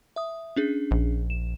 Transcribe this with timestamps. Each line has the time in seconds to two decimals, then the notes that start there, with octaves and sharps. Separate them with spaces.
0.16 E5 D#6
0.56 C#4 D4 G#4
0.91 A#1
1.30 E7